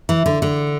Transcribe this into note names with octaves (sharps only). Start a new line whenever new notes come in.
E3
D3
D3